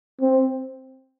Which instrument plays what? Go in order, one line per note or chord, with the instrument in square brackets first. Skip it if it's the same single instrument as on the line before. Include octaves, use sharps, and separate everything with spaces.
[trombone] C4